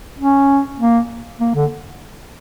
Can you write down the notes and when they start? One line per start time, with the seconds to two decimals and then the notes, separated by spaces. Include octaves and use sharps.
0.19 C#4
0.79 A#3
1.40 A#3
1.54 D3